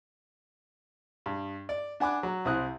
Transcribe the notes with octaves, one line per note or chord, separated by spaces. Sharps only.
G2
D5
D4 F#5 G#5 B5 D6
F#3
C2 C4 E4 D#6 F#6